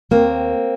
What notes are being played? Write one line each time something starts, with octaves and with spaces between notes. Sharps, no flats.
D#2 A#3 C4